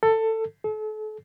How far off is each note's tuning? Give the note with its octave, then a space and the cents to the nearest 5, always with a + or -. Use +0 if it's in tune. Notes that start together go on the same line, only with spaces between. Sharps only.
A4 +15
A4 -40